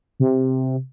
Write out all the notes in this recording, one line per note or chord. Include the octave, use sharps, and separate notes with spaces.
C3